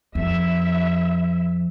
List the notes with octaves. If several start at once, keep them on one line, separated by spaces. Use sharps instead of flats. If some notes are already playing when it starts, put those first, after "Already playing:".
F2 E5